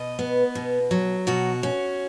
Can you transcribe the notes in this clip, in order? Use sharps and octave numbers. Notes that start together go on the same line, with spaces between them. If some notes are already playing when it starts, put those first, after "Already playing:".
Already playing: B2 D#5
B3
B2
F#3
B2 F#4
C#4